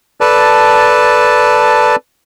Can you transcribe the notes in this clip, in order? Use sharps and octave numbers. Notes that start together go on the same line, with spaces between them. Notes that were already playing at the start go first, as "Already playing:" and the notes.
A4 B4 D5 A5